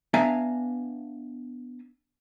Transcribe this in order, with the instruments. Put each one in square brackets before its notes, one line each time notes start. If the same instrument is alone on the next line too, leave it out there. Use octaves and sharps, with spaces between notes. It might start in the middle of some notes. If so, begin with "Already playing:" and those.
[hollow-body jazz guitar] B3 D4 E5 F5 G#5 A#5